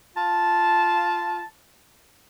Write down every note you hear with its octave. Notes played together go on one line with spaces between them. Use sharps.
F4 A5